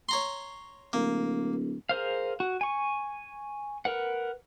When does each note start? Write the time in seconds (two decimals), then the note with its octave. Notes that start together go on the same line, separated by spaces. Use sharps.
0.09 C#5 A#5 C6
0.93 D1 A#3
1.89 G#4 A#4 C5 F5
2.40 F#4
2.61 G#5 C#6
3.85 A#4 B4 F#5